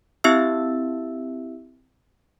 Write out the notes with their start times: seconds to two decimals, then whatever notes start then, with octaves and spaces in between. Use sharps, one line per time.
0.24 C4 E4 G4 E5 E6